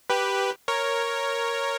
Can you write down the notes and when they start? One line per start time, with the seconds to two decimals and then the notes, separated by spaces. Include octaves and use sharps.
0.10 G4 B4
0.68 A#4 C#5